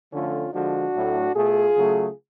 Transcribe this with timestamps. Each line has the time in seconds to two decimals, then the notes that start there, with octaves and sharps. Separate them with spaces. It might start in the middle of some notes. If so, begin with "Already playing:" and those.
0.13 D3 F3 A3 C#4 F4
0.53 D3 F3 G#3 D4 F#4
0.95 A2 F#3 A3
1.35 B2 A3 F4 G#4
1.76 C#3 F#3 A3